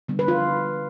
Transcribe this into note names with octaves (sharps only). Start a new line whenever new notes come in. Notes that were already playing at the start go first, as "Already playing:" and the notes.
D3 G3 B3
B4
F4